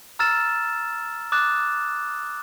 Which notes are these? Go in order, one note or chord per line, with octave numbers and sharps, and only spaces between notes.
A#5 E6 F6 A6 E7
D6 D#6 F#6 A6 E7